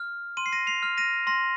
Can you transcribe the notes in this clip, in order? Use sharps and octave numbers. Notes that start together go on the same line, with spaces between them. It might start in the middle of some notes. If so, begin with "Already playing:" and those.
Already playing: F6
C6 D#7
C7
A#6 D#7
C7 F7
F6
A#6 D#7
C6 A#6